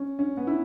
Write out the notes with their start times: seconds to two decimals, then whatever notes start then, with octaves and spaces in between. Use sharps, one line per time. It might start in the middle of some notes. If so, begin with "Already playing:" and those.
Already playing: C#4
0.19 C#4
0.37 B3
0.47 E4